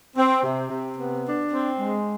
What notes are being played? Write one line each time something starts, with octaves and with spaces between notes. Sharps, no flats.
C4
C3
C3
B3
D4
C4
G#3